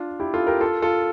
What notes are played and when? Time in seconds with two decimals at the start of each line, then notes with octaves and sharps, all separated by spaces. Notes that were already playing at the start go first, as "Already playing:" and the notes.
Already playing: D4 F4
0.20 E4 G4
0.34 F4 A4
0.47 G4 A#4
0.61 F4 A4
0.82 F4 A4